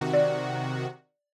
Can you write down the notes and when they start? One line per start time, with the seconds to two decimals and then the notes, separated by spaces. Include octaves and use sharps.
0.01 C3 D#3 F#4
0.13 D5